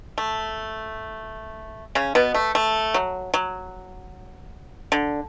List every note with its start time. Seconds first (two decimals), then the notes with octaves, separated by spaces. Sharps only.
0.18 A3
1.95 C#3 C#4
2.15 B2 B3
2.34 A3
2.55 A3
2.94 F#3
3.34 F#3
4.92 D3